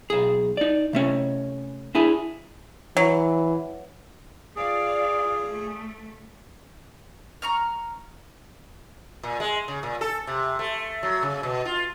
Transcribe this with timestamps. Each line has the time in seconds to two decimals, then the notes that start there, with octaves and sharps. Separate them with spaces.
0.10 B1 G#4
0.57 D#4 D5
0.93 C3 A3 C#4
1.95 D4 E4 G#4
2.97 E3 F#3
4.56 F4 G#4 D5 F5
5.48 A3
7.42 A#5 C#6 F6
9.23 A#2
9.40 G#3
9.68 C#3
9.83 A#2
10.01 A4
10.27 C3
10.59 A3
11.03 F#3
11.23 C#3
11.43 B2
11.65 F4